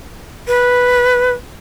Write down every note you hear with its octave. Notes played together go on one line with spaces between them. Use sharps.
B4